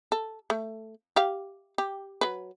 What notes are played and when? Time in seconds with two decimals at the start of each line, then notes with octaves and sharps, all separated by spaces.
0.12 A4
0.50 A3
1.16 G4 F5
1.78 G4
2.21 F#3 B4